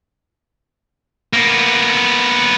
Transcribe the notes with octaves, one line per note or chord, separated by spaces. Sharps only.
A#3 B3